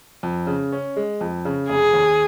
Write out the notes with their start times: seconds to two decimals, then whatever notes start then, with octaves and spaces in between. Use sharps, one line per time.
0.23 F2
0.47 C#3
0.72 C#4
0.96 G#3
1.21 F2
1.45 C#3
1.69 F1 G#4
1.93 D#2